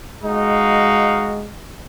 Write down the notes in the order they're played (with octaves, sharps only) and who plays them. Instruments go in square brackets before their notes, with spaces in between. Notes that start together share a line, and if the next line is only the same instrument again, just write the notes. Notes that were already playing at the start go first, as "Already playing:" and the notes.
[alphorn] G#3 [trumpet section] D#4 F#4 F5